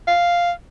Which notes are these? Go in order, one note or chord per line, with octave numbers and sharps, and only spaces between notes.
F5